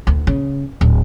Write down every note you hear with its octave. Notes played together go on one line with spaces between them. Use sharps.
D2
C#3
D1